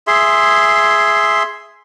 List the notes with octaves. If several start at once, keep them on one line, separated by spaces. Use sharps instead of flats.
G#4 E5 C6